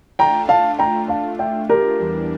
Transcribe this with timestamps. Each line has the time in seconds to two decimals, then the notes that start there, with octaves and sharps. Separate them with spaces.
0.19 A3 D4 F4 G5 A#5
0.49 F5 A5
0.79 G5 A#5
1.08 F5 A5
1.39 E5 G5
1.69 G4 A#4
1.99 E2 E3 G3 D4